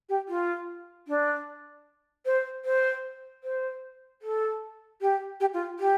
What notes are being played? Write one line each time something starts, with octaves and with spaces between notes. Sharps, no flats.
G4
F4
D4
C5
C5
C5
A4
G4
G4
F4
G4